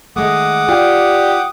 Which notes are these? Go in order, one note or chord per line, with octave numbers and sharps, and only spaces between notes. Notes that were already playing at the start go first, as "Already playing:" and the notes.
D#3 G#3 A3 F#5 D6 D#6
F4 G4 D5 G5